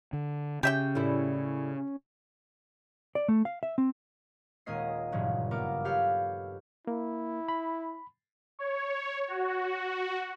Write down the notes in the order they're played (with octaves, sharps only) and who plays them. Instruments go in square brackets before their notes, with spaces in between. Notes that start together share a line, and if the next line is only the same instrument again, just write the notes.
[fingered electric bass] D3
[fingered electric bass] C#3 [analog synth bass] C#4 [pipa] G4 E5 G5
[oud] A2 G3 E4
[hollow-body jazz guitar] D5
A3
F5
E5
C4
[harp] D#1 G#3 A#3 C#4 D#5 C7
F#1 G2 A#2 C#3 E3
A#3 B3 A#4 D6
G4 A4 B4 C#5 F5
[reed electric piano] A#3 [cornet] E4
[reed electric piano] B5
[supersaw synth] C#5
F#4